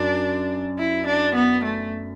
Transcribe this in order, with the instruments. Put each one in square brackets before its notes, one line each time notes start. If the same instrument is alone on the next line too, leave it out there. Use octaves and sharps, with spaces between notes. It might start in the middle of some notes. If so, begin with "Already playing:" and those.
Already playing: [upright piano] F#2 [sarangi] D4
[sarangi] E4
D4
B3
A3